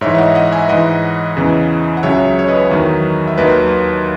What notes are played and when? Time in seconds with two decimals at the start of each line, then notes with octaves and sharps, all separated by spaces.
0.01 G#2 C#5 E5
0.06 E3
0.15 E5
0.18 D#5 F#5
0.35 D#5 F#5
0.52 E5 G#5
0.69 G#2 E3 D#5 F#5
1.37 E2 C#3 E3
1.97 F#5
2.03 C#2 C#3 F#3 C#5 E5
2.39 C#5
2.48 B4 D#5
2.70 E2 D#3 F#3
3.27 E5
3.38 D#2 D#3 F#3 B4 D#5